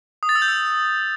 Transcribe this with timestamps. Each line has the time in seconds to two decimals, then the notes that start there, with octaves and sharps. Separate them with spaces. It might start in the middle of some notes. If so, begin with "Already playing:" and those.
0.23 D#6
0.29 A6
0.35 E6
0.42 G6
0.48 E6